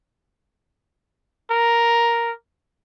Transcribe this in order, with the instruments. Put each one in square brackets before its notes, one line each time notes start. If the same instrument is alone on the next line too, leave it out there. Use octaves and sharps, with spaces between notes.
[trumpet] A#4